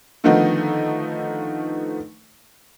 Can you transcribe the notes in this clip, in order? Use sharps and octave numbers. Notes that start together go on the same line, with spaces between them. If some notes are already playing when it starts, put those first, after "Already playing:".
D3 D#3 F3 A3 B3 D#4